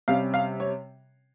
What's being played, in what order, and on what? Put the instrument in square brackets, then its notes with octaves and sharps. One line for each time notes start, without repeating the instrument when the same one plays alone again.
[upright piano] C3 G3 C#4 F5
F5
C#5